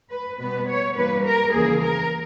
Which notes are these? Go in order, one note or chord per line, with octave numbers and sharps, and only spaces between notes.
B4
B2 G3 B3 B4
C#5
G2 E3 G3 A#3 B4
A#4
D#2 C#3 E3 A#3 G#4
A#4